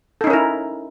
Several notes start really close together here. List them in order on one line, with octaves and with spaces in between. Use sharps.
A4 D#4 C#4 A#4 E4